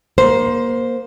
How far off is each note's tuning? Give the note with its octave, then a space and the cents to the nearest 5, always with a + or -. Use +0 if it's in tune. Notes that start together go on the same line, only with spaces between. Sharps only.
A#3 +20 C5 +0